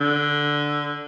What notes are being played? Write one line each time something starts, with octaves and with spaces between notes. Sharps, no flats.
D3